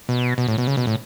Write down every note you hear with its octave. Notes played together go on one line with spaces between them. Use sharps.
B2
B2
A2
B2
C#3
B2
A2